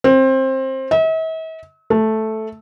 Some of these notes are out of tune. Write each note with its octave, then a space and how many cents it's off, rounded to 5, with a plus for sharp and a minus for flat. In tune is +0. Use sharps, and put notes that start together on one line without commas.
C4 +20
E5 -45
A3 -5